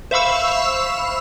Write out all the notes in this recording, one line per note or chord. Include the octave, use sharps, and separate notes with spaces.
C5 E5 F5 B5 C#6 E6